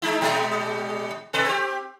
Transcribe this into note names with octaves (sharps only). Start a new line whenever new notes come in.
G#3 D#4 E4
A#2 G3 G#3
B2 A4 B4
C4 G4